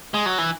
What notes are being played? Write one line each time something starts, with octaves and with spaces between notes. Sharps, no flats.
G#3
F#3
E3